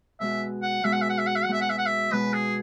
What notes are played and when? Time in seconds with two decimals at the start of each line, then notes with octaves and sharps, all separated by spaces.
0.20 B2 G#3 B3 F#4 E5
0.62 F#5
0.83 B2 G#3 B3 F#4 E5
0.93 F#5
1.01 E5
1.09 F#5
1.18 E5
1.27 F#5
1.35 E5
1.44 F#5
1.48 B2 G#3 B3 F#4 E5
1.61 F#5
1.70 E5
1.78 F#5
1.86 E5
2.12 B2 G#3 B3 F#4 B4
2.33 G#4